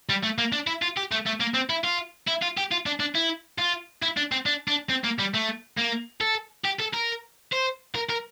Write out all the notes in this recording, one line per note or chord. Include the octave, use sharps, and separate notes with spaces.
G3
A3
A#3
D4
E4
F4
G4
A3
A3
A#3
C4
E4
F4
E4
F4
G4
F4
D4
D4
E4
F4
E4
D4
C4
D4
D4
C4
A#3
G3
A3
A#3
A4
G4
A4
A#4
C5
A#4
A#4